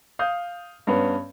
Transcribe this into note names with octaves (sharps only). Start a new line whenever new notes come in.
F5 D#6 G6
G2 B3 C#4